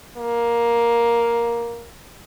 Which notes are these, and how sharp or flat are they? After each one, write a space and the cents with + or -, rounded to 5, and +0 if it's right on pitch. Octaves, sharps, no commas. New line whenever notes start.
A#3 +10